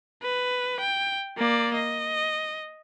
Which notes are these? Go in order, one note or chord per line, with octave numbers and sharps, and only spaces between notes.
B4
G5
A#3 D5
D#5